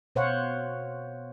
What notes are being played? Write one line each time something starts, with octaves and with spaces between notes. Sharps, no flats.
B2 C5 C#5 F5 F#5